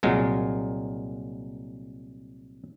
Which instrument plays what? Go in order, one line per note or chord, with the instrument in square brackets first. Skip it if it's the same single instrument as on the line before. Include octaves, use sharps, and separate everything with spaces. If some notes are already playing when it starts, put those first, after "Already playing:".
[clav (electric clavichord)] C2 A#2 F#3 G#3